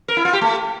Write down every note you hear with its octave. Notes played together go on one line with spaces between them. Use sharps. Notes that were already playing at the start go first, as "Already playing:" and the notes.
A#4
E4
F4
G4
A3